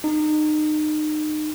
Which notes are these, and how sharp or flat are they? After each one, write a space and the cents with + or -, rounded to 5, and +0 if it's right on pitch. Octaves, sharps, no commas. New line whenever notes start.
D#4 -30